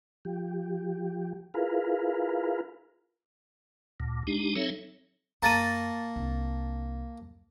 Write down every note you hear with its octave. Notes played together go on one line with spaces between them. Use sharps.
F3 G4
E4 F4 G#4 A#4 B4 F5
D2 A#2
G#3 D4 D#4 G4
F#3 C4 D#4 A4 C#5 E5
F#2 A#3 A5 A#5 C#6 A6 D#7
C2 D4